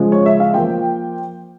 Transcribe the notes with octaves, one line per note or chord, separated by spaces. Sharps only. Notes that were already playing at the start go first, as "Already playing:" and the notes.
Already playing: C#3 F3 G#3
C#5
E5
F5
F3 A#3 F4 G5